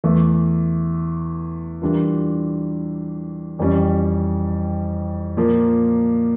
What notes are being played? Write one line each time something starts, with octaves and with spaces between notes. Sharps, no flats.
E2 E3 A3
E3 G3 D4 F4 A#4
F2 E3 G3 C#4
A#2 F3 A#3